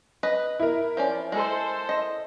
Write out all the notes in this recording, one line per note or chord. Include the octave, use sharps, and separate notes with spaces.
B4 D#5
E4 A#4
F3 C#4 D5
G#3 A4 C5
D#5